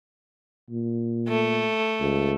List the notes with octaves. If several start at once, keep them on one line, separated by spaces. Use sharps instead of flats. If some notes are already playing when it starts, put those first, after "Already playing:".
A#2
A3
C#2